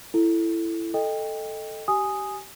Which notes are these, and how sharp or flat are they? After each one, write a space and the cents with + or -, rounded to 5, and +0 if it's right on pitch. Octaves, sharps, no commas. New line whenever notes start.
E4 +15 A4 +0
A4 +0 D#5 +0 G5 +25
G4 -25 G#5 +0 D#6 +0